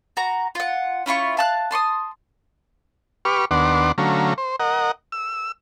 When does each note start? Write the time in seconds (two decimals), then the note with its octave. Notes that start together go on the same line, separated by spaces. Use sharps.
0.17 F#4 A#5
0.55 F4 F#5
1.06 C#4 E4 F4 C#6
1.37 F5 A5 F#6
1.71 A5 C6 C#6 D#6
3.25 G4 B4 C#6 D6 F6
3.51 D#2 B3 D4 F#5 C6 D6
3.98 D3 F#3 A3 C#4 F5 A#5
4.38 C5
4.60 A#4 D#5 F#5
5.12 E6